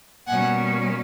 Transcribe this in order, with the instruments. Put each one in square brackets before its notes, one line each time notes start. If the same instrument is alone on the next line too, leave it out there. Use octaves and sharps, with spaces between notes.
[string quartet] B2 G3 A#3 C#4 F#5 G#5